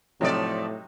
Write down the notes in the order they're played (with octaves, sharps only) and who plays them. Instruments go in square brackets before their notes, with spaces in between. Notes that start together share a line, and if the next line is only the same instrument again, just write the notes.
[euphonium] A2 [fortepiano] C3 F#3 D#4 [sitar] F3 A3 D5